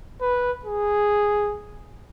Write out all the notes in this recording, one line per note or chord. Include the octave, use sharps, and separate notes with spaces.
B4
G#4